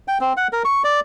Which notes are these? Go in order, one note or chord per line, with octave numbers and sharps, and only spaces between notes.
G5
C4
F#5
A#4
C#6
D5